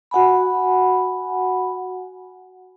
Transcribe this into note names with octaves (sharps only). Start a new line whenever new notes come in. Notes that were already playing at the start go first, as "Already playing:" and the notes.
F#4 F#5 G#5 B5